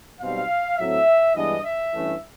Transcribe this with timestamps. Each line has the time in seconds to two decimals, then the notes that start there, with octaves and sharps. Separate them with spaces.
0.21 B1 B2 G3 C4 F5
0.78 A2 F#3 A3 C4 E5
1.35 G2 E3 G#3 B3 D4 D#5
1.64 E5
1.92 G2 E3 A3 C#4